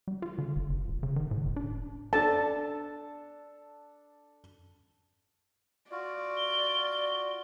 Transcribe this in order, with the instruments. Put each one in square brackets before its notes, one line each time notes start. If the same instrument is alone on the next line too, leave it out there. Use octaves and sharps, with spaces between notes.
[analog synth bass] G3
F4
D3
F#1
F#1
D#1
C#3
D#3
A2
F1
D4
[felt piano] D4 A4 [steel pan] A5
[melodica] F4 F#4 [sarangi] D5
[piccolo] G7